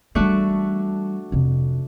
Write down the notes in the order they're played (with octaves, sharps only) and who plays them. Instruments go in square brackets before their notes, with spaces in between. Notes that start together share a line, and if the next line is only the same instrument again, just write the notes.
[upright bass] E3 G3 [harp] A3 D4 F#4
[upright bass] F2 C3